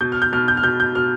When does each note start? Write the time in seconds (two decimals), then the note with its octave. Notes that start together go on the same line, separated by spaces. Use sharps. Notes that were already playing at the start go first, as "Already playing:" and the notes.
0.01 B2 G6
0.12 F6
0.22 G6
0.33 B2 F6
0.48 G6
0.57 F6
0.63 B2 G6
0.80 G6
0.95 B2 F6